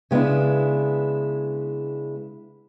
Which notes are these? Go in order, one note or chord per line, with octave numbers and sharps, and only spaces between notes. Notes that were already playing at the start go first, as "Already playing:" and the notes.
C#3 G#3 B3 D4 E4